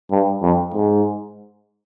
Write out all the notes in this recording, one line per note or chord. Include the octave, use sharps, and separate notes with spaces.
G2
F2
G#2